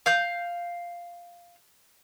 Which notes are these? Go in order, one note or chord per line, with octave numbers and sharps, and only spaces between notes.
F5 G6